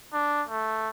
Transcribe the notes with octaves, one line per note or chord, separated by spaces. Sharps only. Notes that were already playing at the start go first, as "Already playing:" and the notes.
D4
A3